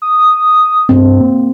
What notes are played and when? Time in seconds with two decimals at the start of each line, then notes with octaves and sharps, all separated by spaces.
0.02 D#6
0.89 G2 C4
1.21 A#3